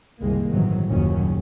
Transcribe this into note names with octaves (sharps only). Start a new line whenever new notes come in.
F#1 C2 D#3 G#3 A#3
G1 A2 C3 D#3 E3 F#3
F#1 D#2 A#2 D#3 F#3 C#4